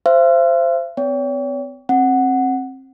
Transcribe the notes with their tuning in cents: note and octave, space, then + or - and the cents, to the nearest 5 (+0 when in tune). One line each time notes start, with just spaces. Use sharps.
C5 +0 E5 +45
C4 -45 C#5 +40 G5 +0
C4 +25 F#5 +0